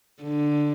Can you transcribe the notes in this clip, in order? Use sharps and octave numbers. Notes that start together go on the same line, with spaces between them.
D3